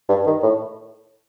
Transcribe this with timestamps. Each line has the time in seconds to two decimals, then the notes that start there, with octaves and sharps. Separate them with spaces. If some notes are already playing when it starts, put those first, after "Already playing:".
0.09 G2
0.26 D#3
0.43 A2